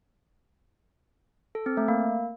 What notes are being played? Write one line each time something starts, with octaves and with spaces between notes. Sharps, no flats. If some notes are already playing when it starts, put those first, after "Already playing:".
A4
C4
A3
A#3